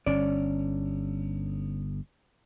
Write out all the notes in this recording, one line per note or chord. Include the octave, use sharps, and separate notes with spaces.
G1 C#4 D5